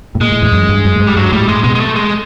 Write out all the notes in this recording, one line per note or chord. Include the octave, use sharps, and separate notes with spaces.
A2
A#2 G#3
A2
E2
F#2
G2
F#2
A2
G#2
G3
G2 F#3
A2 G3
A2 G#3
B2 G#3
G#3
A3
G#3